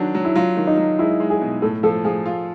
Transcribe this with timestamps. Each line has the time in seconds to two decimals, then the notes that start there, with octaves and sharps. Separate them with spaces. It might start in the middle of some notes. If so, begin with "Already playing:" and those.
Already playing: D#3 F#3 D4 F#4
0.14 F#3
0.25 E4
0.35 F#3 F4
0.57 D#3
0.67 D#4
0.77 F#3
0.99 G#3 E4
1.20 G#3
1.30 G#4
1.41 B2
1.62 A2 A4
1.83 F3 A4
2.04 F3 G#4
2.26 F4